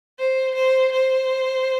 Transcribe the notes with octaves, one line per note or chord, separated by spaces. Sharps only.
C5
C5
C5